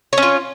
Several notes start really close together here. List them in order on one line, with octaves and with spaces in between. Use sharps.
C#5 C#4 F4